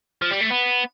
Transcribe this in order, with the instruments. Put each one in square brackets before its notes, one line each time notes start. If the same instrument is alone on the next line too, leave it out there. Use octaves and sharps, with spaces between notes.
[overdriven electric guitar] F3
G3
A3
B3